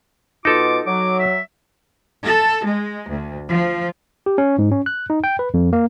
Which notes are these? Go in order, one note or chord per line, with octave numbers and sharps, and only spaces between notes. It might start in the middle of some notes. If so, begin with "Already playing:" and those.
B2 D#4 F4 A4 D6
F#3 D6
E5
A4
G#3
D2
F3
G4
C#4
G#2
C#4
F#6
D#4
G5
B4
F2
A#3